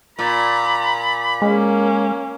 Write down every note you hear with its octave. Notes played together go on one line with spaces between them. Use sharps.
A#2 A#5 B5
G#3 A#3 C#4